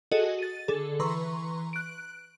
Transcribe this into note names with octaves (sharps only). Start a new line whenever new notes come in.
F#4 G#4 A4 D#5
A6 D#7
D3 G#4 A4
E3 B4 A#5 C6 C#6
F#6 D7